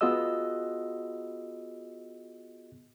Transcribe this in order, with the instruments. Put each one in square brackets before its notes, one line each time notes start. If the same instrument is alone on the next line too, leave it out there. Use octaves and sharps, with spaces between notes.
[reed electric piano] B3 F4 F#4 G#4 D#5 E6